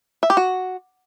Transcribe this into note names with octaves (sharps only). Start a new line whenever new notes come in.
E5
G4
F#4